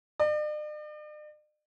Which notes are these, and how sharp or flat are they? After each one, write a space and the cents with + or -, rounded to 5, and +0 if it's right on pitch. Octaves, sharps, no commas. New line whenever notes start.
D5 +45